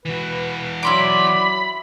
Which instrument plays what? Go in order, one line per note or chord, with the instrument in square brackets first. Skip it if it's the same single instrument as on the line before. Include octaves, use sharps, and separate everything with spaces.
[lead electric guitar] E3 F#4 [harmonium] B4
[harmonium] F#3 D5 [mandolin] E4 C6 D6 [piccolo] B5